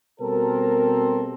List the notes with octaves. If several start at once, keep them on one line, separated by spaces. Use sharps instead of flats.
B2 G3 C4 A4 A#4